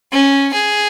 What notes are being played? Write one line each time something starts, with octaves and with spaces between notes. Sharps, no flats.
C#4
G#4